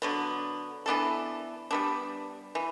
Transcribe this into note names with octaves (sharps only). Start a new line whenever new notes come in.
D3 F#3 B3
E3 B3 D4 A4
G3 B3 D4
E3